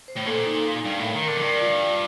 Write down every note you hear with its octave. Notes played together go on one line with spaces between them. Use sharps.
C5
A2
A#2 A4
D#4
F5
G2 F5
A2
A#4
D#3
D3 A#4
F2
G2 D5
F4
F4